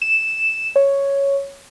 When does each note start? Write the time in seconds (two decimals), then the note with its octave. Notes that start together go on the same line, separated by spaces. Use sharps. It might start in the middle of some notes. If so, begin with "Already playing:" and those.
0.02 E7
0.76 C#5